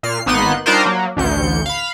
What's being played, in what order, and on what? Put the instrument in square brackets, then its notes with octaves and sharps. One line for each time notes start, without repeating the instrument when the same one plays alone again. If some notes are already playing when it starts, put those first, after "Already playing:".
[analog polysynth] A#2 F6 C7
G#1 A#3 B3 D#4 C6 F#6
G3 D4 D#4 F4 A#4 C5
F#3 A#3
A1 D2 G6 C#7
F5 B5